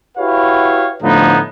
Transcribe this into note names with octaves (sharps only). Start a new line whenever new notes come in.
E4 F#4 G4 B4 C#5 F5
A2 D3 F3 A3 B3 D#4